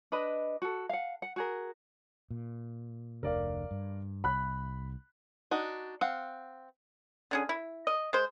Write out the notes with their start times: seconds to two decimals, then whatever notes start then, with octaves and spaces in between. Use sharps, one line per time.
0.12 D4 B4 D#5 B5
0.62 F#4 A4
0.89 F5 F#5
1.22 F#5
1.36 F#4 G#4 A#4
2.31 A#2
3.23 F1 D2 D3 A#4 D5 F5
3.71 G2
4.24 C2 B5 F#6
5.51 D4 D#4 F#4
6.01 C4 F5 F#5
7.31 D3 C#4 G#4
7.49 E4
7.87 D#5
8.13 G#3 C5